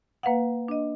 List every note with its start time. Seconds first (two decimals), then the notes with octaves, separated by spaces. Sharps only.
0.23 A#3 B4 F5 F#5
0.68 D4 D#5